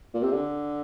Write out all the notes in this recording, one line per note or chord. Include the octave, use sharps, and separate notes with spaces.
A#2
C3
D3